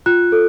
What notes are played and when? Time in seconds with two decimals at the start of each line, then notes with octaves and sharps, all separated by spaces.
0.06 F4 F#6
0.32 A4